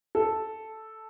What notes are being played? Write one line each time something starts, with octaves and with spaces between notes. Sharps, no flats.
A4